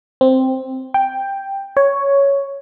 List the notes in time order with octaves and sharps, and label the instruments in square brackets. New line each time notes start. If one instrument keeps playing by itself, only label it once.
[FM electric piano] C4
G5
C#5